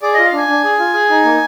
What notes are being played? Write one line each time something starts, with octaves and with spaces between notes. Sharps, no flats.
G#4 D5
F4 D#5
F5
D4 G#5
D4
G#4
F4
G#4
D#4
A#3